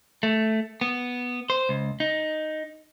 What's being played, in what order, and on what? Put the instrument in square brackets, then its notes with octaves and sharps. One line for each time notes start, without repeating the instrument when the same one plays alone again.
[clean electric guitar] A3
B3
C5
C#2
D#4